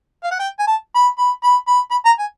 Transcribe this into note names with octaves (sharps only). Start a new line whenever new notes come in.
F5
F#5
G5
G#5
A5
B5
B5
B5
B5
B5
A#5
G#5